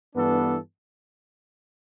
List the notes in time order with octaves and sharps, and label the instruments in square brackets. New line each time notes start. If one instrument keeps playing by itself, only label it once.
[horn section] G2 E3 B3 D4 A4